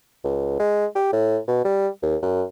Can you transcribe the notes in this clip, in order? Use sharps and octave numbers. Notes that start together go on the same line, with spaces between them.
C#2
G#3
G4
A2
B2
G3
D#2
F#2